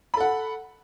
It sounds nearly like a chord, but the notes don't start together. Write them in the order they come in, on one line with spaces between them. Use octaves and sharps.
B5 A4 F#5